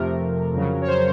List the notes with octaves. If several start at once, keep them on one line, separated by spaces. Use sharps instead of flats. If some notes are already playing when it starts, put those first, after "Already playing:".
Already playing: F2 C3 F3 A3 A#4
F2 C#3 F#3
C#5
C5